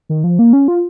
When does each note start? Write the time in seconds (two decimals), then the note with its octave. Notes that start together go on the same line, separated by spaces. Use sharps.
0.09 D#3
0.24 F3
0.39 A#3
0.53 C#4
0.68 F4